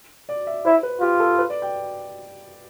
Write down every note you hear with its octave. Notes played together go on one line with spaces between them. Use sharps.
D5
E5
E4 C5
B4
F4 G4
A4
B4
D5
G5